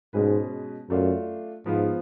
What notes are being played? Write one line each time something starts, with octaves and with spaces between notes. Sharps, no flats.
G#2 B2 G#3 C#4 G#4 B4
F#2 A3 D4 F4
G#2 F3 B3 F4